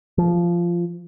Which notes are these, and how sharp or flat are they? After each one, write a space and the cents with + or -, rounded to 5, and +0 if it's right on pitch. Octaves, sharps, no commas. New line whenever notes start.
F3 -15